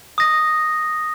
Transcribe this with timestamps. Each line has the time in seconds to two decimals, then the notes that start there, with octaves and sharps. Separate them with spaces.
0.18 D#6 A#6